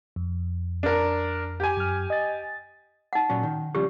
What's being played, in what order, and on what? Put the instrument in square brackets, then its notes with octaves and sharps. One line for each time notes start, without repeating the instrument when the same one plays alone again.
[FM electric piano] F2
[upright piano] D4 A#4
G4 G#5
[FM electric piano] F#2 F6
D#5 A6
[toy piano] D#4 F#5
[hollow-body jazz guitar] A#2 F#3 C#4
D#3
[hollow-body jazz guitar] C#3 F3 G3 [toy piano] G4